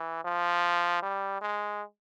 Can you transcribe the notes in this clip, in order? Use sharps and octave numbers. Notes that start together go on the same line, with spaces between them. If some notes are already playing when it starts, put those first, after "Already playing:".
Already playing: E3
F3
G3
G#3